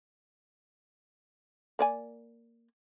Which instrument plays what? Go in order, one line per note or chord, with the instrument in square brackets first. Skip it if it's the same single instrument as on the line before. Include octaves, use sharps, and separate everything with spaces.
[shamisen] A#3 D5 G#5